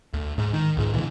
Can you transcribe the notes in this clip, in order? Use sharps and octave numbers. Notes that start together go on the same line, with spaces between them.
D2
G#2
D#3
C#2 G#2
D2 B2 D3 E3